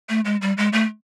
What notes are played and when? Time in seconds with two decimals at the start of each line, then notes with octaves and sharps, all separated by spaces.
0.09 A3
0.25 G#3
0.42 G3
0.58 G#3
0.73 A3